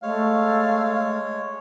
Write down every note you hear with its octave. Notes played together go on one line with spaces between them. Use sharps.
G#3 A3 C#5 F5